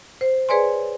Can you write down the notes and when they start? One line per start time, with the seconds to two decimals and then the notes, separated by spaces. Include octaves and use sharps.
0.21 C5
0.49 G#4 B4 C#5 D5 G#5 C6